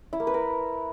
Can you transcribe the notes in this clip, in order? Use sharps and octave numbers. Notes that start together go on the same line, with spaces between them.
E4
A#3
B4
A#4